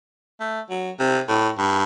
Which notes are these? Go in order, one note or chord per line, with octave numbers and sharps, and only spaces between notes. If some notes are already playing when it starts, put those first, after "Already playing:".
A3
F#3
C3
A2
G2